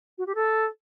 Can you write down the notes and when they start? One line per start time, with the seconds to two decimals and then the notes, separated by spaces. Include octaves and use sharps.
0.18 F#4
0.27 G4
0.35 A4